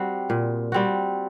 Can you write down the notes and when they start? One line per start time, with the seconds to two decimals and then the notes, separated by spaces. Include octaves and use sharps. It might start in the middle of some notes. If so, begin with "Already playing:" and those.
Already playing: G3 C4 F#4
0.30 A#2
0.72 G3 C4 F#4